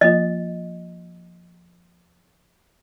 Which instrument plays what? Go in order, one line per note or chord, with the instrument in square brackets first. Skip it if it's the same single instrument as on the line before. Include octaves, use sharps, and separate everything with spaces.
[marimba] F3 A#3 F4 [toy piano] D#5